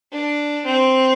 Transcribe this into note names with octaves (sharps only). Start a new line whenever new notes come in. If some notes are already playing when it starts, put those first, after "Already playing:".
D4
C4